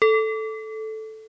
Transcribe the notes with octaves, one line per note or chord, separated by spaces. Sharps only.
A4